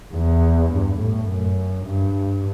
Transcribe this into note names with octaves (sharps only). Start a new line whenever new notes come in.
E2
G2
A2
F#2
G2